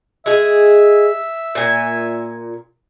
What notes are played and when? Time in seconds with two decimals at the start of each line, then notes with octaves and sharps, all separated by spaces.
0.26 G#3 G#4 E5
1.55 A#2 G#5